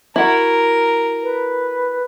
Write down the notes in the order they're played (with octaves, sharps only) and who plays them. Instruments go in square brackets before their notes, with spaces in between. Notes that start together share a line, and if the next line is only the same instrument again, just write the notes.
[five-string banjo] E4 F#4 [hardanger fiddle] A#4
[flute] B4